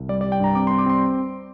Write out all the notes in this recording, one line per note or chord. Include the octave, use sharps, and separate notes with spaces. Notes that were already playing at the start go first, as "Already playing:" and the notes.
Already playing: C2
G3 D5
D5
G3
G5
G2 A#5
C4 D6
C6
C4
D6
C4 C6